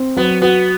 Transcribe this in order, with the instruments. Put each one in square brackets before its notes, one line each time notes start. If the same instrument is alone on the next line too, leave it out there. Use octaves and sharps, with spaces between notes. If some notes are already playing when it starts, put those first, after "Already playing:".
Already playing: [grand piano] C4
[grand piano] F#3 [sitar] B3
[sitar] B3 [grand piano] F#4